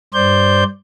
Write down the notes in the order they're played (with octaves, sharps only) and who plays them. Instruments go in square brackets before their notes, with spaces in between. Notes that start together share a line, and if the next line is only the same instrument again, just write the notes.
[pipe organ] G2 C5 D5 G6